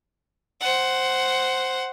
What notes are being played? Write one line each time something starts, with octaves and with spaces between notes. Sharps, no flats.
C5 F#5